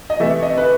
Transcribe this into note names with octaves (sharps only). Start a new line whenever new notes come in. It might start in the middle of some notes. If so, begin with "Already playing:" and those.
D#5
C3 E3 A3 E5
D#5
B4